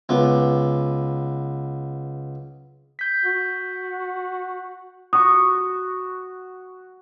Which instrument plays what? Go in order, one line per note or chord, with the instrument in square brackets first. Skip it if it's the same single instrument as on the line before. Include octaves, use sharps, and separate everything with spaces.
[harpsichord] C#2 B3
[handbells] G6 B6
[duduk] F#4
[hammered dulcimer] F#4 C#6 [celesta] D#6